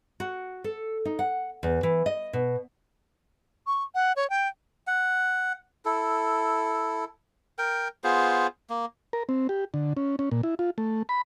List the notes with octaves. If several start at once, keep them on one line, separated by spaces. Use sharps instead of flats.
F#4
A4
D#4
F#5
E2
E3
D#5
B2
C#6
F#5
C#5
G5
F#5
E4 A4
A#4 G5
B3 F4 G#4 C5
A#3
A#4
C4
G4
D3
C#4
C#4
A#2
E4
F4
A3
B5